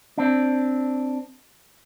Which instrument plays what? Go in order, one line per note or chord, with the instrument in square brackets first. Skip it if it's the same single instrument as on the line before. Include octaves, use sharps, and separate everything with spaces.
[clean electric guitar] C4 D4